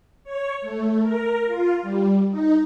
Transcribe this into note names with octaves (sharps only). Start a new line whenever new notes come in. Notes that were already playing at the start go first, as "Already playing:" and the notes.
C#5
A3
A#4
F4
G3
D#4